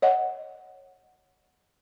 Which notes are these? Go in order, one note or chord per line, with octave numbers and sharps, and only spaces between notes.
C#5 D#5 F#5